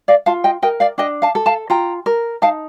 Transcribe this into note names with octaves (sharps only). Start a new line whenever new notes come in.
D5 F5
F4 F5 A5
D#5 G5
A#4 D#5 G5
D5 F5
D4 D#5 G5
F5 A5
A4
F5 A5
F4 G5 A#5
A#4
D#4 F5 A5